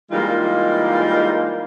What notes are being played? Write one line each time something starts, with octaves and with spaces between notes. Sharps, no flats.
E3 G3 G#3 A#3 D#4 F4